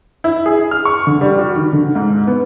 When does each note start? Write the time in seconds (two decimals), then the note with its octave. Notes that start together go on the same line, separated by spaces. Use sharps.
0.24 E4
0.46 G#4
0.71 F6
0.85 C#6
1.07 D3
1.21 G3
1.38 F#4
1.56 D#3
1.73 D3
1.95 G#2
2.27 B3